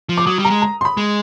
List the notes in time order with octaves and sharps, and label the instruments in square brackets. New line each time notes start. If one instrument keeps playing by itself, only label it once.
[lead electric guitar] F3
[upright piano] D6
[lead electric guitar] F#3 [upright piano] D#6
[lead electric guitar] G3
[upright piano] A#5
[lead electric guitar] G#3
[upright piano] A#5
C6
B5
[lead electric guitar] G#3